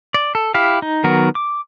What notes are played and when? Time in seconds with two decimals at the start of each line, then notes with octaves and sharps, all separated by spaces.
0.14 D5
0.35 A4
0.54 E4 G4 F5
0.82 D#4
1.04 D#3 F#3 B3 F#4 A#4
1.35 D6